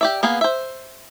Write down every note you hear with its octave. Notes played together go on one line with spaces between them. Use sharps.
G4 D5 E5
A#3 B3 G#4 F5
C5 E5